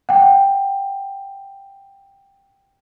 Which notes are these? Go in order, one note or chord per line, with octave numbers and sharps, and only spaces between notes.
F#5 G5